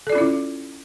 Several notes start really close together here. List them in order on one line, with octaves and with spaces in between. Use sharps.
A4 D5 F4 C#4 E4